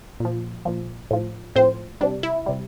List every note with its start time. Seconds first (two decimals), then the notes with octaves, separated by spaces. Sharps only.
0.20 A#2 F3
0.65 A#2 F3
1.11 A2 F3
1.55 A2 F3 C4 C5
2.01 C3 G3 D4
2.23 E4
2.46 C3 G3